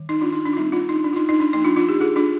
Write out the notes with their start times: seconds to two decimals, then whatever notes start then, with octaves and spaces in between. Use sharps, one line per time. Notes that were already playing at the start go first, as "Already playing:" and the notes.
Already playing: D#3 G3
0.09 D#4
0.21 D4 F4
0.32 D#4
0.46 D4
0.53 F4
0.57 G3 C4 D#4
0.72 D4 F4
0.89 D#4
1.04 D4
1.13 F4
1.16 D#4
1.29 D#4
1.40 D4
1.53 F3 A#3 D4 D#4
1.65 D4 F4
1.76 D4 F4
1.88 D#4 G4
2.00 F4 G#4
2.16 D4 F4